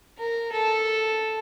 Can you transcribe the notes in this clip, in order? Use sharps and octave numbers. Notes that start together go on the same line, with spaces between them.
A#4
A4